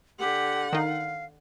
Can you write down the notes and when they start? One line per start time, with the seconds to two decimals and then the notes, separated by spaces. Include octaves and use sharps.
0.19 D3 G4 F#5
0.73 D#3 D#4 F5